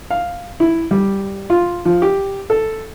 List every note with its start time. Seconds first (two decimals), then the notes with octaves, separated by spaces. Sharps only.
0.11 F5
0.60 E4
0.91 G3
1.50 F4
1.85 F3
2.02 G4
2.50 A4